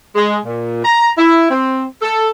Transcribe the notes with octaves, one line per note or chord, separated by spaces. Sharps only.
G#3
A#2
A#5
E4
C4
A4